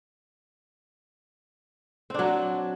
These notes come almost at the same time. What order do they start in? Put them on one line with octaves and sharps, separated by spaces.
C4 D4 F#3